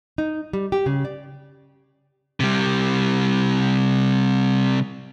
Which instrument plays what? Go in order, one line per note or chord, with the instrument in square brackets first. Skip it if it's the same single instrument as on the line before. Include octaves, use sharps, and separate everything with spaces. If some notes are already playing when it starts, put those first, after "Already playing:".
[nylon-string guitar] D#4
G3
G4
C#3
D5
[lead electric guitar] C3 G3